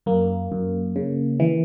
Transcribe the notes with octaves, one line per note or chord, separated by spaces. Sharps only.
F#2 A#3
F#2
C#3
E3